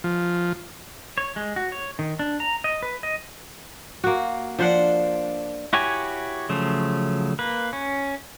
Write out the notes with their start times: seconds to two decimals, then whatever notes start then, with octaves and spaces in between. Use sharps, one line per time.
0.04 F3
1.18 C#5
1.36 G#3
1.56 F#4
1.72 C#5
1.99 D#3
2.19 D4
2.40 A#5
2.64 D#5
2.83 B4
3.03 D#5
4.04 A#3 F#4
4.59 F3 D4 C5 F#5
5.73 E4 F#4 G4 C#5 G#5
6.49 C#3 F3 F#3 A3
7.39 A#3 B4
7.73 C#4